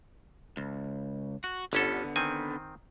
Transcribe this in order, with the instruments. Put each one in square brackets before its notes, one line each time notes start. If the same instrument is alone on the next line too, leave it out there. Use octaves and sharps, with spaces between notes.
[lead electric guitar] C#2
F#4
[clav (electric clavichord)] G1 C#4 A4 [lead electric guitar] D3 B3
[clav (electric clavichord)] D#3 C4 G#5